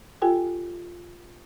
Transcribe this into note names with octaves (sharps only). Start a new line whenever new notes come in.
F4 G4 A4 G5 G#5